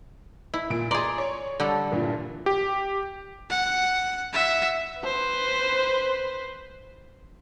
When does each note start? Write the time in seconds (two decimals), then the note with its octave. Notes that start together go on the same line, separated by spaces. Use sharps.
0.54 E4
0.70 A#2 D7
0.91 G#4 D5 A#5 C6
1.18 C#5
1.60 D3 G3 A4
1.92 G2 A#2 E3
2.46 G4
3.50 F#5
4.33 E5 F#5
5.00 B4 C5